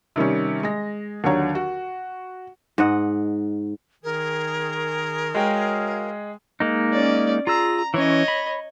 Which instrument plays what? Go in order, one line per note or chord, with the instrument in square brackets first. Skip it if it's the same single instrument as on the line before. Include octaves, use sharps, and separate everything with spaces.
[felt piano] C3 D#3 G3 C#4
G#3 A#6
D#2 D3 F#3 C#5 A#5
F#4
[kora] G#2 D#5 F#5
[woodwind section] D#3 G#4 [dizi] A#4
[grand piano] G#3 G#4 G5 [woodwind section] F#4 C#5 F5
[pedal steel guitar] G#3 A#3 D#4
[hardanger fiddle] C#4 D5
[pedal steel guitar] F4 G#4 E6 [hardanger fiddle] A#5
[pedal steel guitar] E3 C#4 [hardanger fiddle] C#5 D#5
[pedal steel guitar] B5